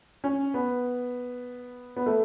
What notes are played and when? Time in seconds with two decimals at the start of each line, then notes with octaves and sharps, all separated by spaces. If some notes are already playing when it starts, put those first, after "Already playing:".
0.24 C#4
0.54 B3
1.96 B3
2.06 A3